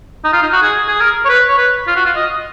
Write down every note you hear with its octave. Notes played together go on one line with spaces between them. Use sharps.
D#4
F4
D#4
F#4
G#4
G#4
A#4
C#5
B4
C#5
B4
F4
F#4
F4
D#5